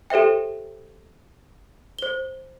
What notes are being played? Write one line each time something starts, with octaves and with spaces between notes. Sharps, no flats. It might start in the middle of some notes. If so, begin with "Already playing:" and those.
G4 A4 C5 E5 G5
C5 G7